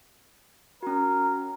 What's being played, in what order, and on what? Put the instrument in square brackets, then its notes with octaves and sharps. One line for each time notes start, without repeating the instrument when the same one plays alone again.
[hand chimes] C#4 F#4 [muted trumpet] A#4